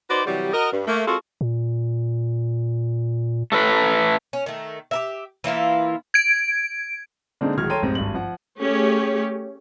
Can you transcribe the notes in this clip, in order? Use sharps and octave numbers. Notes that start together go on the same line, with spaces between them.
D#4 F#4 B4 C5 D5
C3 E3 F#3 G3
F#4 A#4 D#5
G2
A3 A#3
G#3 C4 F4 F#4 A4 A#4
A#2
A3 A4 B4
C#4
D#3 A3
G4 A#4 E5
E3 A#3 E4 F4
G#6 D7
D3 G#3 A#3 C4 D4 D#4
D1 D#3 G#3 F#4 F6 G#6
A4 C#5 G5 A#5 C6 D#7
F1 G#2 C4
G#1 G2 F#7
F3 F#5
A3 C#4 G4 G#4 C#5